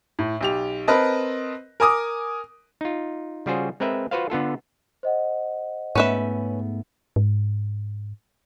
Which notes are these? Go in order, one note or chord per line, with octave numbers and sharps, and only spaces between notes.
A2
B1 G4 F7
C4 A#4 B4 D#5 A5
A#4 G#5 D6 D#6
D#4 F4
C#3 G3 F4 F#4 G#4 C5
G#3 C4 A#4 B4 E5
F4 F#4 B4 C5 F5
D3 B3 F4 A4
C5 D#5 F#5
G#2 A3 B3 C#4 B4 E5
G#2